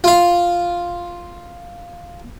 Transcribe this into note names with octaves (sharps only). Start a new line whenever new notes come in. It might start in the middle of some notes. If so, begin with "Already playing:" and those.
F4 F5